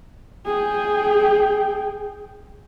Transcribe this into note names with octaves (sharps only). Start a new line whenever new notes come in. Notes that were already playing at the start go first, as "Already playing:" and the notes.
G#4 G5